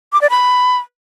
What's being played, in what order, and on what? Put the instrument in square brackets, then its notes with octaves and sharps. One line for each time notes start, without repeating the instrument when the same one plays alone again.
[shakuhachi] D6
D5
B5